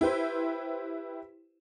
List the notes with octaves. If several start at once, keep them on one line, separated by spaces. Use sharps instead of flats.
E4 G4 B4 C5